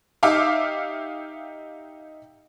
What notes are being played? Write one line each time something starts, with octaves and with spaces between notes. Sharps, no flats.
D#4 G4 E5 F5 D6